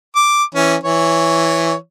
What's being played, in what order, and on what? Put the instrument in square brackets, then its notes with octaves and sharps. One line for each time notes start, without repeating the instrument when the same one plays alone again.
[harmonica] D6
E3 C#4
E3 C#5